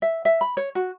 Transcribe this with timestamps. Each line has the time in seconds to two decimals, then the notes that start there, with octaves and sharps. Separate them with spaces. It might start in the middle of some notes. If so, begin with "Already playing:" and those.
0.02 E5
0.25 E5
0.41 B5
0.57 C#5
0.75 F#4